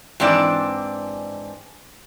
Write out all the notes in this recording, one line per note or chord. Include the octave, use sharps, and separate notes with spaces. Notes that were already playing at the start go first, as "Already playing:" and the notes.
G#2 E3 C4 D4 D5